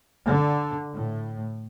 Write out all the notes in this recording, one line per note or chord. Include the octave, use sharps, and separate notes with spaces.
D3
A2